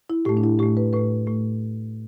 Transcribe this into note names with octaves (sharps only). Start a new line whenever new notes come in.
E4
A2 A3 G4
D4
E4
A2 A3 G4
B4
A2 A3 B4
A2 A3